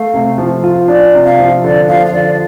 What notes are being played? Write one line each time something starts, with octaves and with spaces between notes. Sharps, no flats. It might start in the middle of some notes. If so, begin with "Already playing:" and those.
Already playing: A3 F5
C3
F3
F4
D4 D5
C3
F5
F3
D3 D5
F3 F5
F5
D3 D5